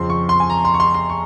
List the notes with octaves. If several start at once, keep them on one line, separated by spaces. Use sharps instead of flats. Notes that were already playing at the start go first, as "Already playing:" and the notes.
Already playing: F2 C#3 F3 C4 C6
C#6
C6
G#5
A#5
C6
C#6
C6
C6
C#6